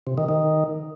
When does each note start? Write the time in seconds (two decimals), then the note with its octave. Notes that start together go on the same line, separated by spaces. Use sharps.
0.07 C3
0.18 D#3
0.29 D#3